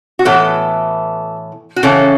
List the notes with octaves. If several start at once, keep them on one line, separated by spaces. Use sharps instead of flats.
F#4
A2 E3 B3 A4
F#4
C#3 E3 C#4 A4